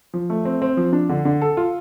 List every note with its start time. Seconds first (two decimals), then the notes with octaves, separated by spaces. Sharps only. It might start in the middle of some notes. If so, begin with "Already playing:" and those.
0.14 F3
0.30 A3
0.45 C4
0.62 C4
0.77 F3
0.93 D4
1.09 D3
1.25 D3
1.42 A4
1.57 F4